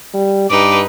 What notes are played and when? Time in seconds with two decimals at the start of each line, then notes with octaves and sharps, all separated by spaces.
0.14 G3
0.50 G2 D#4 B4 D6